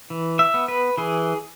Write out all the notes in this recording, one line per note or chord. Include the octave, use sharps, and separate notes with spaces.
E3
E5
B3
B4
E3 G#4